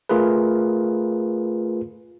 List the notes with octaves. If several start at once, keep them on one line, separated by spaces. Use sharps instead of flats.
A3 F4 G#4 A#4 B4